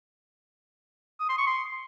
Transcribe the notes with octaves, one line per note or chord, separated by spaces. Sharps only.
D#6
C6
C#6
C6